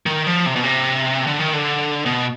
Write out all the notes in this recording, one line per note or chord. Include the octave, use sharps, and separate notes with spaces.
D#3
F3
C3
B2
C3
D3
D#3
D3
B2